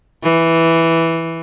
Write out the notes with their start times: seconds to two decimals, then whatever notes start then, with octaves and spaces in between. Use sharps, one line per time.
0.23 E3